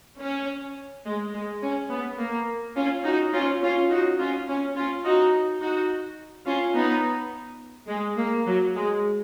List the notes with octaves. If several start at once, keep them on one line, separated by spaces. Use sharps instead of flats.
C#4
G#3
G#3
C#4
B3
A#3
C#4 F4
D#4 F#4
C#4 F4
C#4 F4
D#4 F#4
C#4 F4
C#4
C#4 F4
D#4 F#4
D#4 F#4
C#4 F4
B3 D#4
G#3
A#3
F#3
G#3